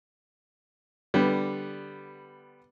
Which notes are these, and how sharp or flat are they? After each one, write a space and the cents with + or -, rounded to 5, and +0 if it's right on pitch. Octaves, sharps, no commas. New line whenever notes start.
D3 -5 G3 +0 B3 +0